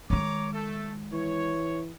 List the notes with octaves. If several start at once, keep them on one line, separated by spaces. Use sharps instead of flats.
D#3 G#3 C#5 A#5 D6
A3 A4
E3 C#5